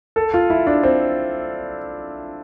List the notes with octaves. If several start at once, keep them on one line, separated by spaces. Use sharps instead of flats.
A4
F4
E4
D4
C4